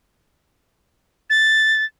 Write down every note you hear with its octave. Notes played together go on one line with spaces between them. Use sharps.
A6